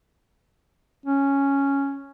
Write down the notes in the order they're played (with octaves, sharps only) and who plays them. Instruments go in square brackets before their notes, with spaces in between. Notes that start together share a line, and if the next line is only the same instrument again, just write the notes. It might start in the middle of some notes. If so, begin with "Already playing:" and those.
[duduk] C#4